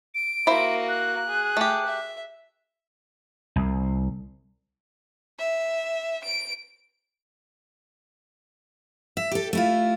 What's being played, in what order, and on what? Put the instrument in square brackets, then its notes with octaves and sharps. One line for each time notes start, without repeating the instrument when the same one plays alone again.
[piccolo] D7
[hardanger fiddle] A#3 F#4 [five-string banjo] E4 C5 E5
[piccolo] F#6
[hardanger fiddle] G#4
[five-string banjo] A3 G4
[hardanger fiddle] E5
[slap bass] C2
[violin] E5
D7
[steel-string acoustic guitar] E5
G4 A4
A3 E4 F4